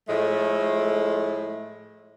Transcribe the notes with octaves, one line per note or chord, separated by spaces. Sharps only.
A2 F3 G#3 A3